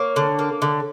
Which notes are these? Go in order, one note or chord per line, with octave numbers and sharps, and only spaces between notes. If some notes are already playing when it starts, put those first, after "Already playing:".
Already playing: A#3 C#5
D3
A#3
D3